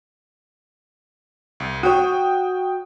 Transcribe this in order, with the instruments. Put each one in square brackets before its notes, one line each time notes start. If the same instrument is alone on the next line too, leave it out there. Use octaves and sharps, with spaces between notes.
[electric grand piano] C2
[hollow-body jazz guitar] F#4 C#5 [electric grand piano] G5 D#6